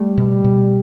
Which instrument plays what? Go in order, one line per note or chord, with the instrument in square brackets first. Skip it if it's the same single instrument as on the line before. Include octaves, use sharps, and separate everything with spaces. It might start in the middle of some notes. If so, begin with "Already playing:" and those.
Already playing: [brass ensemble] G3 [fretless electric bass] A3
[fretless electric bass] B2
B2